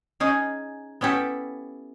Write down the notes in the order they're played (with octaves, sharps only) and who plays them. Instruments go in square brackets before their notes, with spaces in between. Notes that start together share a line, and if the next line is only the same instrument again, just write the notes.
[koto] C#4 D#4 G#4
B3 C#4 E4 G4 A4